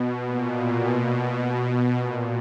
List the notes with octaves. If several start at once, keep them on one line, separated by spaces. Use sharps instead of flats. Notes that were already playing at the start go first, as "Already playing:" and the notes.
Already playing: B2
A#2
B2
A#2